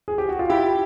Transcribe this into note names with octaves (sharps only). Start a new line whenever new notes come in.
G#4
G4
F#4
F4
E4 G4